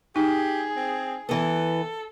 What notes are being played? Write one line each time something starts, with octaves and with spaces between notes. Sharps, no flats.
D#4 G4 G#4
C4
E3 B3 A4